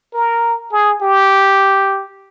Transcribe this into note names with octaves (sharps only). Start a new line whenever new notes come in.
A#4
G#4
G4